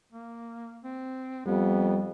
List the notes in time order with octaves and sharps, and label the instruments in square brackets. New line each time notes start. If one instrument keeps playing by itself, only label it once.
[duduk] A#3
C4
[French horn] F2 [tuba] G3 [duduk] B3